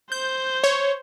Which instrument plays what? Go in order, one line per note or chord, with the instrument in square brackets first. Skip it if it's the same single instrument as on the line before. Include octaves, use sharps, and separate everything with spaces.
[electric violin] C5 [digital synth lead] G6
[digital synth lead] C#5